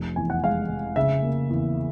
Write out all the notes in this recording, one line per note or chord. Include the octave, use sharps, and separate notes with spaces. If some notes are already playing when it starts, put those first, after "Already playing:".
Already playing: F1
E2 G#5
F#5
G#3 F5
F1
C#3 E5
A#3
E2